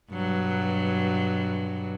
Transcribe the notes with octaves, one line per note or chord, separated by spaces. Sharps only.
G2 B2 F#3